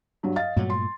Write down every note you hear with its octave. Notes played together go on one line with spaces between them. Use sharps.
G2 F#3
D#5 F5 A6
G2 A#2 F#3 A3
C6